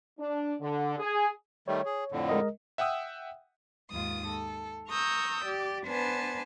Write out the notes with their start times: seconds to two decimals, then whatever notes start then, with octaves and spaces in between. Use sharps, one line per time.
0.19 D4
0.61 D3
0.99 G#4
1.68 D#3 G3 A3 C#5
1.86 G#4
2.12 F2 A2 D3
2.29 G#3 A#4 D#5
2.78 E5 F#5 G5 D#6 E6
3.91 D#2 G#2 F4 D#6
4.26 A4
4.90 A#5 C#6 D#6 E6 G6
5.46 G4 D5
5.88 B3 D4 B4 C5 G#5 A5